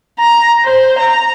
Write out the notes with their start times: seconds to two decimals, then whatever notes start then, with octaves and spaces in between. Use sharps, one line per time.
0.19 A#5
0.64 C5
0.98 A#5